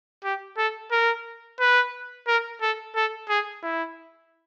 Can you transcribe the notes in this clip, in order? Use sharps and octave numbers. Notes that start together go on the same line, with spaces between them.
G4
A4
A#4
B4
A#4
A4
A4
G#4
E4